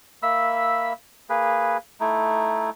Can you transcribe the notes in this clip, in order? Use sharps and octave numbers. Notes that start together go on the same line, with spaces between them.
A#3 E5 B5 E6
A#3 G#4 B4
A3 D#4 E4